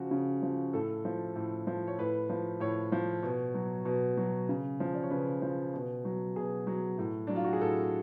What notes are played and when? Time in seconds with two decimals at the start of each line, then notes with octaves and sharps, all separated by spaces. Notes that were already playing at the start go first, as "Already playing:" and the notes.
Already playing: C#3 F3 F#4
0.11 C#3
0.43 F3
0.73 A2 A4
1.05 F3
1.36 A2
1.67 F3
1.87 C#5
1.98 A2 B4
2.29 F3
2.60 A2 C#5
2.92 F3
3.23 B2
3.55 F#3
3.85 B2
4.17 F#3
4.49 C#3
4.80 F3
4.94 D5
5.03 C#5
5.10 C#3 B4
5.42 F3
5.74 B2
6.05 F#3
6.36 B2 G#4
6.67 F#3
6.98 A2
7.27 F#3 D4
7.36 F4
7.44 F#4
7.53 G#4
7.61 A2 A4